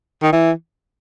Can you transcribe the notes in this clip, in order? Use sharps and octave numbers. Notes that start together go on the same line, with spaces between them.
D#3
E3